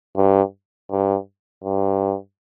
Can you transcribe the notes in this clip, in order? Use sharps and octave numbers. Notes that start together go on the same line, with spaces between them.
G2
G2
G2